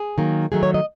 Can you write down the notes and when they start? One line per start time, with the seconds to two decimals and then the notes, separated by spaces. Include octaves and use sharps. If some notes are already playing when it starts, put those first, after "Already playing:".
Already playing: G#4
0.18 D#3 F#3 A#3
0.52 D#3 F#3 A3 G#4
0.63 C#5
0.74 D#5